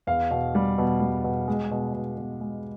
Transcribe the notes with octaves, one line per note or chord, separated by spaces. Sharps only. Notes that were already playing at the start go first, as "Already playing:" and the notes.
E2 F5
B2
G3
B2
G3
B2
G#3
B2
B2
B2
G#3